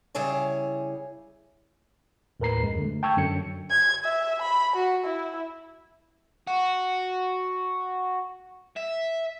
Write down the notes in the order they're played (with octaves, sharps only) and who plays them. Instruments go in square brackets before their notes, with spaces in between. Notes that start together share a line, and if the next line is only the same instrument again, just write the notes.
[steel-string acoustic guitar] C#3 G3 E4 G#4 C#5
[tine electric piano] D#2 A2 A#4 B4 A#5 C7
F#2 G#3
D3 A3
G5 A5 C#6 E6 G6 G#6
F#2 D3 F#3 C#7
[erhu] G#6
E5
B5
F#4
E4
[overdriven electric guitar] F#4
E5